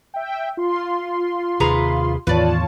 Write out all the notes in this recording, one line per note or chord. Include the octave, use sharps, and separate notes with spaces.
E5 G5
F4 C6
D#2 C3 G#4 B4 A#5
E2 A2 D#3 F4 B4 C#5 D5 A5